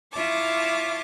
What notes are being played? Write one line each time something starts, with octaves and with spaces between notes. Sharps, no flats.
E4 F4 C#5 A5 D6